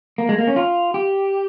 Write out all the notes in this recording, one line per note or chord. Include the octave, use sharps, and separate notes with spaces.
A#3
G#3
A#3
C#4
F4
G4